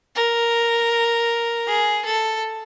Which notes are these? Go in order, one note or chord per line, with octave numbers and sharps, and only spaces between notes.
A#4
G#4
A4